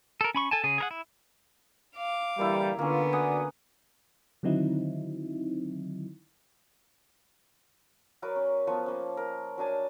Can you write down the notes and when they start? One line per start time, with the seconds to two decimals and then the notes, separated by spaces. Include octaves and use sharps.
0.21 A4 A#4
0.35 C#4 B5 C#6
0.51 A4 G#5 A5
0.64 C#3 G#4
0.78 G#4 A#4 F#5
0.91 E4
1.95 F5 D6
2.39 D3 E3 G3 A#3 E4
2.79 D3 A#3 B3 C#4 F4
3.13 F#4 D5 F#5 G#5 D#6
4.43 D3 D#3 F#3 C4 D#4 E4
8.22 F#3 A#4 B4 D5
8.36 C#4
8.67 F3 B3 C#6
8.86 A#3 C#4
9.17 A#4
9.58 F#3 D4 G#5 A5